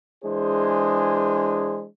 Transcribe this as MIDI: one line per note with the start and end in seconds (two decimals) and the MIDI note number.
0.24 1.85 52
0.24 1.85 56
0.24 1.85 62
0.24 1.85 68
0.24 1.85 72